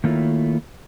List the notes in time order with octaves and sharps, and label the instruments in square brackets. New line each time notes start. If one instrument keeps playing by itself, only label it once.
[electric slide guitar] D#3 A3 A#3 E4 F4 C#5